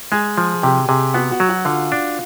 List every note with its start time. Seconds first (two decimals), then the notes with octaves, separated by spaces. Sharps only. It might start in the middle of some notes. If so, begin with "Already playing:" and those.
0.12 G#3 G#4 G#5
0.38 F3
0.62 C3 G4 G5
0.88 C3 G#4 G#5
1.14 B3 F#4 F#5
1.31 F#4 F#5
1.40 F#3
1.49 F#4 F#5
1.65 D3 F4 F5
1.92 D4